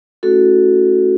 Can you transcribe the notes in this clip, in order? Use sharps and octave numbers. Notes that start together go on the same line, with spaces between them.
A3 C#4 E4 F#4 A4